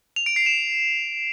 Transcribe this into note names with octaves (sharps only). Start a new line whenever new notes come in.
F7
D7
C7
E7